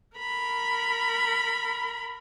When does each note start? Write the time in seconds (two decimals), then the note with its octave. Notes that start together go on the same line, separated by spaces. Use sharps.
0.17 A#4 B5